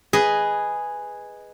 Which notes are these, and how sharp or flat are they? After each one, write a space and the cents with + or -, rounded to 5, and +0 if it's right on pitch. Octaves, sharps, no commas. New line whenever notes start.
G#4 -5 B4 +0 D#5 +0